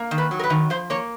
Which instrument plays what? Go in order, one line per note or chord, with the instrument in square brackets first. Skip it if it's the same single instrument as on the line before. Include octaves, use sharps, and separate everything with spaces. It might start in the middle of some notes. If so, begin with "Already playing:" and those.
Already playing: [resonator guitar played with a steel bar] A#3
D#3
B4
F#3
A#4
B4
D#3
F3 C5
A#3 C#5